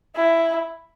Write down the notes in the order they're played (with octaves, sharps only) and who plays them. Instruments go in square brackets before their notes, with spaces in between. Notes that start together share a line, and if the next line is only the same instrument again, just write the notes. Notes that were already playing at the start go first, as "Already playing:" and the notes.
[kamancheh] E4